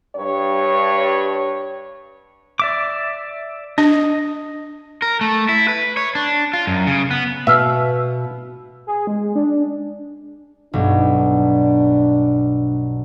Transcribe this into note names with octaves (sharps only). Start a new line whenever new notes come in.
G2 C#5
D5 E5 D6
D4 D#5
A#4
A3
E4
B4
C#5
D4
F4
F#2
C#3
B3
B2 E5 F5
G#4
G#3
D4
B1 G2 D4